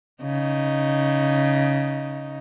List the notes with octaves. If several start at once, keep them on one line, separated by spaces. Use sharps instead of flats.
C#3 D#4